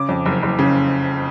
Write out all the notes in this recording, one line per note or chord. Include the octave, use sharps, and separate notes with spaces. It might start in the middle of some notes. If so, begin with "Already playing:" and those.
Already playing: C#3 D6
F2
F#1
F#1
C#3